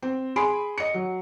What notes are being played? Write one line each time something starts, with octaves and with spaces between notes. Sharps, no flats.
C4
G#4 B5 C6 D7
D#5 C#7
F#3